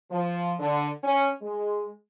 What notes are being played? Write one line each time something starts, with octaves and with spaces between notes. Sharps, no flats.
F3
D3
C#4
G#3